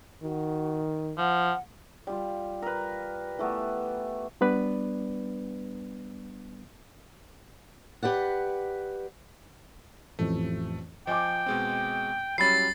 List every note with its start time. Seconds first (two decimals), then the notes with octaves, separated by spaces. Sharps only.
0.22 D#3 F#4
1.18 F3 F#5
2.07 G3 F4
2.62 A#4 B4
3.39 E3 A3 B3
4.41 G3 B3 D4 B4 D5
8.03 G4 B4 D5 F#5
10.19 A1 F2 A3
11.07 F3 D#5 G5 G#5 D6
11.46 B2 G#3 C4
12.38 F#3 G3 C#4 E4 B5 A6 C7